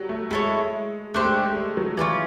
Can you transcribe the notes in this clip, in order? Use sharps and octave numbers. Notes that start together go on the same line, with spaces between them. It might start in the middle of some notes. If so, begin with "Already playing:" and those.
Already playing: F#3 G3
A3
G#3 E4 A4 C#5
A3 D4 G4 C5
G#3
G#3
G3
F#3
E3 C#4 F4 A4 D5